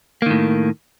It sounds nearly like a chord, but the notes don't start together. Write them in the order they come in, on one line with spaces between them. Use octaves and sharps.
A#3 D#3 A2